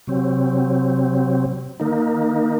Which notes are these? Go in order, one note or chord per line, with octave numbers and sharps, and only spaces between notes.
C3 F#3 C4
D#3 A#3 D#4